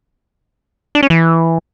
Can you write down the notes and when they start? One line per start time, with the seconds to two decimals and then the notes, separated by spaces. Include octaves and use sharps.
0.95 D4
1.03 C#4
1.10 E3